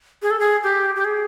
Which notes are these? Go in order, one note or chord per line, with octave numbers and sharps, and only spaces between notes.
G#4
A4
G#4
G4
G4
G#4